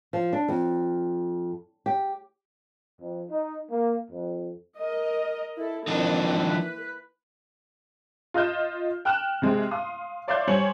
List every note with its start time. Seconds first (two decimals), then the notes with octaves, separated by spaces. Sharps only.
0.13 F3
0.33 D4
0.48 F2
1.86 G4
2.99 F2
3.30 D#4
3.70 A#3
4.10 F2
4.78 A#4 D#5
5.57 E4 A4
5.88 E3 F3 A#3 C4 D4 D#4
6.50 B4
8.34 F4 D#5 F6 G6 E7
9.05 G5 F6 F#6 E7
9.42 C3 G#3 C4
9.71 F5 C6 D#6
10.28 C#5 D5 E5 F5 C6 G6
10.47 G3 C5 C#5 G#5 C#7 F#7